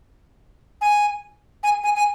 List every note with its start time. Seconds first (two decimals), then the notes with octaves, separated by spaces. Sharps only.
0.81 G#5
1.63 G#5
1.84 G#5
1.96 G#5